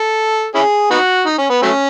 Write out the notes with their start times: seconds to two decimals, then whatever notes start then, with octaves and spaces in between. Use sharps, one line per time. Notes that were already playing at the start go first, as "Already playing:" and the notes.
Already playing: A4
0.55 C#4 E4 G#4
0.91 B3 D#4 F#4
1.26 D#4
1.38 C#4
1.49 B3
1.62 F#3 A3 C#4